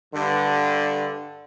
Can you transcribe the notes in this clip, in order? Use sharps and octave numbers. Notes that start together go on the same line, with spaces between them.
G2 D3